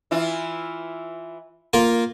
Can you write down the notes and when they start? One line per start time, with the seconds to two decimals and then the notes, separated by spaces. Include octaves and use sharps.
0.11 E3 E4 F4
1.73 A#3 F4 A#4